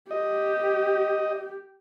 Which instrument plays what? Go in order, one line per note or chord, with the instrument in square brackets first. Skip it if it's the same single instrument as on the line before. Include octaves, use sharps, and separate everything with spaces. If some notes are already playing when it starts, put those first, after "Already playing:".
[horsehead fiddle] G4 [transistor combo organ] D#5